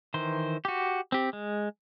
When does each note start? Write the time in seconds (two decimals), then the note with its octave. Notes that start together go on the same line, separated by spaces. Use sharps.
0.14 D#3 E3 C5
0.65 F#4 G4
1.12 C4 G4
1.33 G#3